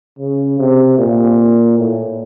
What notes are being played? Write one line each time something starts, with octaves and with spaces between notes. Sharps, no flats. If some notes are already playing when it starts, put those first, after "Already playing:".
C#3
C3
A#2
A2